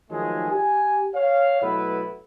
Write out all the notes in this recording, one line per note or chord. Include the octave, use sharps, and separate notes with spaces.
D#3 F3 F#3 G#3 A3 G#4
G4 G#5
C#5 F5
B2 F#3 A3 B3 E4 B4